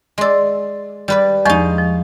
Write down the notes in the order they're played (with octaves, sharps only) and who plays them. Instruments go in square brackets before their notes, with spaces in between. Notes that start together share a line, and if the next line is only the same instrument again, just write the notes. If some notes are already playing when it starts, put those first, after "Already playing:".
[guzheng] G#3 D5 [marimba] C6 E6
[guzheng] G3 B4 D5
[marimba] E2 F3 C#6 [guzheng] G#3 D#4
[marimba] F3